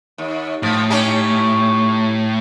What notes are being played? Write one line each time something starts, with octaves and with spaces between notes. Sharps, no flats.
D#2
A2 F3
C#4 D#4 G4